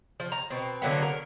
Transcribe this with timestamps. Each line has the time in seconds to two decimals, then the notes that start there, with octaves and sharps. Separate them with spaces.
0.20 F3
0.32 A#5
0.50 B2 C4
0.82 D3 F#3 A#3 B3
1.02 A#4